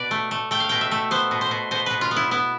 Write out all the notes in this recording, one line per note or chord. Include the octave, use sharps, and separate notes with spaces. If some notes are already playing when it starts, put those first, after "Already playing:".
Already playing: B2 B4 D5
A3
A3
A3 G5
F5
B2 G5
E5
A3
B3 C5
B2
C5
B2
B2 C5
B2 B4
F4
B3
E4
B3 E4